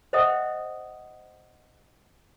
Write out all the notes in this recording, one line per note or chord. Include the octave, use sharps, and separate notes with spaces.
C5 D#5 E5 F#5 G5 D#6